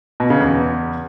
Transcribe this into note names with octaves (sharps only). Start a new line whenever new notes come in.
B2
C#3
E2